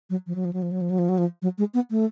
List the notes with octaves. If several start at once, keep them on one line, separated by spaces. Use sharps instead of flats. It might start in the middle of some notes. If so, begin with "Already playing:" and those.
F#3
F3
F#3
F3
F#3
F3
F#3
F3
F#3
F3
F#3
F3
F#3
G#3
B3
A3